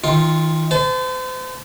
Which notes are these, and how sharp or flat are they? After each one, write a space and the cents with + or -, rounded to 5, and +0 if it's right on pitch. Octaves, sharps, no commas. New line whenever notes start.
D#3 +35 F4 +0 C6 +25
C5 -40 A5 -20